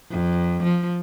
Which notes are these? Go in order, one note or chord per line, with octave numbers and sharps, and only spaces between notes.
F2
F3